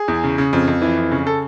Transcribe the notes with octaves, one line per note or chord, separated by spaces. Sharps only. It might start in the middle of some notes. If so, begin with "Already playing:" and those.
Already playing: G#4
E2
C#3
C#3
F2
F2
E3
F2
C#3
A4